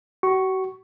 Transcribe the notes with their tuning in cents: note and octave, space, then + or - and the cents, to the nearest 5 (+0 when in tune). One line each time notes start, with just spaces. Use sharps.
F#4 +40 C#6 +0